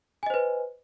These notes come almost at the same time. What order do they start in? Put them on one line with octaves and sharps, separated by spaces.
G#5 D#5 C5 B4